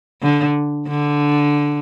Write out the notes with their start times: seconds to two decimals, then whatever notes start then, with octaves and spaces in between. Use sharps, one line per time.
0.22 D3
0.88 D3